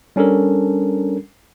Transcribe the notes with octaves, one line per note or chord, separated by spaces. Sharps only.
G3 C#4 D4 A4 A#4